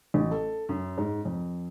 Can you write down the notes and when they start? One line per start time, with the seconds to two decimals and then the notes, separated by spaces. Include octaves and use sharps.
0.14 A1
0.31 A4
0.69 F#2
0.98 G#2
1.25 F2